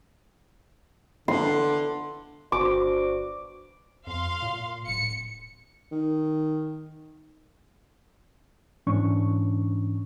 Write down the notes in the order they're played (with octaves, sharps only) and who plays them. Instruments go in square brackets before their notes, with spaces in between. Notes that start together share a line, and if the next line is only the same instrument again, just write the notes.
[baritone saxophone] D3 [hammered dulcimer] C6
[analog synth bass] G1 [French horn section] D4 C5 D5 [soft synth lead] F#4 [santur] D6
[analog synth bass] F2 [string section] F5 C6
[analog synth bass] A#2
[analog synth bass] D1 [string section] C#7
[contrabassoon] D#3
[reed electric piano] G#2 E3 C#4 D4 C#6